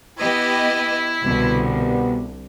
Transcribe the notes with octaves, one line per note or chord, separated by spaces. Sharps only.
B3 E4 G4 D#5
C2 B2 D3 G3 B3